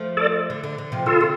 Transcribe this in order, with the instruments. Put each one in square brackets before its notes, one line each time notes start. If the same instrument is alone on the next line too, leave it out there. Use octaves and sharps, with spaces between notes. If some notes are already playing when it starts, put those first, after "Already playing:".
Already playing: [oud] F3 A3
[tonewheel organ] A4 D5
[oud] D3
D3
D3
C3 F3
[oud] D3 [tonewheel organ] F4 A4
[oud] D3